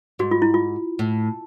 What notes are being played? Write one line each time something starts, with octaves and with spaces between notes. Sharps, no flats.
G#2 F#4
F4
E4
F4
A2